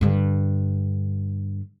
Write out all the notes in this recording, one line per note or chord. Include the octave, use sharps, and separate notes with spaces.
G2 D3